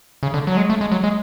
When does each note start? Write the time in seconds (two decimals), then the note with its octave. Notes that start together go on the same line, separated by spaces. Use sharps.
0.23 C#3
0.34 D3
0.47 F#3
0.57 G#3
0.70 A3
0.81 G#3
0.92 F#3
1.04 G#3